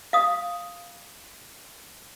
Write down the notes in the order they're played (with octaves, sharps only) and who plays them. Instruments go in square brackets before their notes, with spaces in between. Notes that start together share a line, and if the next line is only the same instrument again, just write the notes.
[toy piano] F5 D#6